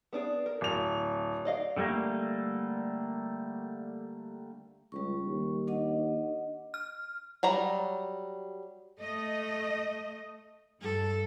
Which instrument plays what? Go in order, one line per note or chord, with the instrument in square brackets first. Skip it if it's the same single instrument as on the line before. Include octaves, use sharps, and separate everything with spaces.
[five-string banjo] B3 D4 G#4
A#4
[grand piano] D1 F7
[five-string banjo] D5 D#5 F5
[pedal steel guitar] D3 G3 A3 A#3
[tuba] C#2 [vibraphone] G3 C#6
[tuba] D#2
[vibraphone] D4 D#5 F#5
[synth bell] F6
[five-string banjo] F#3 G3 A#5
[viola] A3 [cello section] D#5
[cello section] G2 [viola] A4